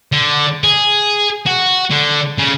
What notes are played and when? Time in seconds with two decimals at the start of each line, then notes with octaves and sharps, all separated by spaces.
0.12 D3
0.64 G#4
1.46 F#4
1.91 D3
2.38 C#3